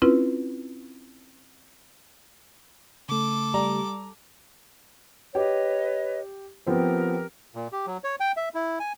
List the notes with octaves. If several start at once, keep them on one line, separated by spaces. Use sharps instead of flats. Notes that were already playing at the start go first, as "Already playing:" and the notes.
C4 C#4 E4 F4 B4
C#3 A3 A4 D6
G3 A#5
G4 B4 C#5 D#5
F3 B3 C4 G4 A#4
A#2
G4
F#3
C#5
G5
E5
E4
G#5